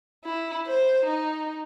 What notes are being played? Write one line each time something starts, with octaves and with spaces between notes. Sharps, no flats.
E4
C5
D#4